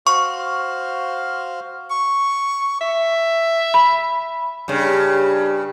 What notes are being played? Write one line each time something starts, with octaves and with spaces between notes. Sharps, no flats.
F#4 C5 F5 C#6
C#6
E5
B5
G2 C#3